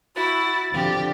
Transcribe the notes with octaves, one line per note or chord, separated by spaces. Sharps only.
E4 F#4 A6
D3 F3 C4 G4